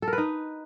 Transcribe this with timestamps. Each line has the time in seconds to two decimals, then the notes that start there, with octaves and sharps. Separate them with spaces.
0.02 A4
0.08 A#4
0.13 B4
0.18 D#4